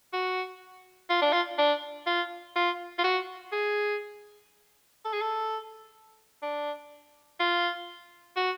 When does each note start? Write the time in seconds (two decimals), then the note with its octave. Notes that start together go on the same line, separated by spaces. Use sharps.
0.13 F#4
1.10 F4
1.22 D4
1.33 F4
1.58 D4
2.06 F4
2.56 F4
2.99 F4
3.04 F#4
3.52 G#4
5.05 A4
5.13 G#4
5.21 A4
6.42 D4
7.40 F4
8.36 F#4